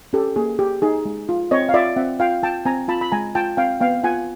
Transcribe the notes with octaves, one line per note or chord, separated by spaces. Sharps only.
C#4 G4 A4
A#3 G#4
G4
D#4 G#4
G#3
F4
C4 C#5 D#5
F5
F4 D5 E5
C4 E5 F#5
F4 F5 G5
F4 G5 A5
C4 G#5 A#5
F4 A5 B5
B5
G#3 G#5 A#5
F4 G5 A5
C4 F5 G5
B3 F5 G5
F4 F#5 G#5